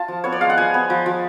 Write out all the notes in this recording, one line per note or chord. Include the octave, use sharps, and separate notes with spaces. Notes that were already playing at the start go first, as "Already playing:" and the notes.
Already playing: F4 A5
F3
B3 C#5
D5
G#3 F5
F#5
F3 G#5
B3
F3
F3